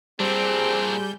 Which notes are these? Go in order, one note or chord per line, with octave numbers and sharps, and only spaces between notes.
A#2 G3 C4 D4 G#4 G6